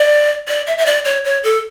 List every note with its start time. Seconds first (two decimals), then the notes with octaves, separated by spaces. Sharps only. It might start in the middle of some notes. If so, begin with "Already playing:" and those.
Already playing: D5
0.48 D5
0.67 E5
0.78 E5
0.86 D5
1.05 C#5
1.25 C#5
1.44 A4